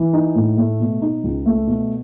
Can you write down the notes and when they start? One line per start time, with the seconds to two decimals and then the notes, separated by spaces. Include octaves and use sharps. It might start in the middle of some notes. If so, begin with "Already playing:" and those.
Already playing: E3
0.13 D#4
0.35 A2
0.57 A3
0.80 B2
1.02 D#4
1.24 C#2
1.46 A3
1.67 B2